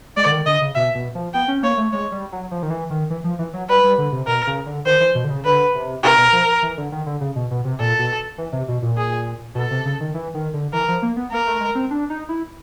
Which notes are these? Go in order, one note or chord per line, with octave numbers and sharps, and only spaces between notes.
G#3 D5
D3
D#3
D3 D#5
C#3
B2 E5
B2
F3
B3 G5
C#4
A#3 C#5
A3
G#3 C#5
G3
F#3
F3
D#3
E3
D#3
E3
F3
E3
F#3
G3 B4
G3
D3
C3
B2 A#4
C#3
D3
D#3 C5
E3
B2
D3
C#3
D3 B4
C3
C3 A#4
B2
F3
E3
D3
D#3
D3
C#3
B2
B2
C3
A#2 A4
B2
E3
C3
B2
A#2
G#4
B2 A4
C3
C#3
D#3
E3
D#3
D3
E3 A#4
F3
A#3
B3
A#3 A#4
A3
G#3
C4
D4
D#4
E4